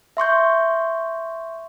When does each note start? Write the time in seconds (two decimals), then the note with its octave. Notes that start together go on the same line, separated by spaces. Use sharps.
0.17 E5 C6 C#6 G6